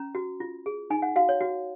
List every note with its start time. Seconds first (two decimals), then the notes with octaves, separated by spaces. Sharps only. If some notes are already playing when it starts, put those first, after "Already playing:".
Already playing: C#4 A#5
0.15 F#4
0.40 F4
0.66 G#4
0.90 D#4 G#5
1.02 F#5
1.16 F#4 F5
1.29 C#5
1.41 F#4